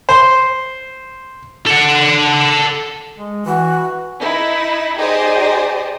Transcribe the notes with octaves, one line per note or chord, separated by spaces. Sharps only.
C5
A4 F#5
G#3
E3 F#4
D#4 E4
D#4 G4 G#4 C5 D5 D#5